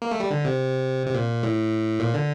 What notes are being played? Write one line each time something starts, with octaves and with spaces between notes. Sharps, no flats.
A#3
A3
G3
D3
C3
C3
A#2
A2
A#2
D3